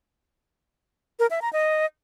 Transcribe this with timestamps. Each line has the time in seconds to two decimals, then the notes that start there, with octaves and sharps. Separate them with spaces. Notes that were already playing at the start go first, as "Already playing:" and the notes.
1.19 A#4
1.31 E5
1.42 A#5
1.53 D#5